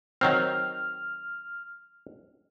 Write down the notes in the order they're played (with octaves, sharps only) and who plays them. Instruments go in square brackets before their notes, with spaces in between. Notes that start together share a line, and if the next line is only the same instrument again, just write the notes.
[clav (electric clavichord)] D#3 F#3 C4 [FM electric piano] F6